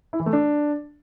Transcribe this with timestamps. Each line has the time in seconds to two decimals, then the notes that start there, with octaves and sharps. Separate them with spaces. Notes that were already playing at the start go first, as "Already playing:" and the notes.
0.13 E4
0.20 E3
0.26 A3
0.33 D4